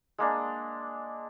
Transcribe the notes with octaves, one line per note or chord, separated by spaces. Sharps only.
G#3 A#3 D4